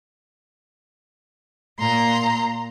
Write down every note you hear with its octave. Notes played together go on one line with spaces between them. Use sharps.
A#2 A#5 C6